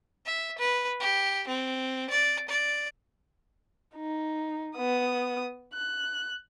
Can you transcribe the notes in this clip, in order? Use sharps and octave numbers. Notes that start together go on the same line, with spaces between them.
E5
B4
G4
C4
D5
D5
D#4
B3 D#6
F#6